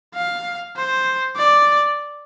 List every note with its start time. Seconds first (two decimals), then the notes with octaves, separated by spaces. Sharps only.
0.15 F5
0.76 C5
1.36 D5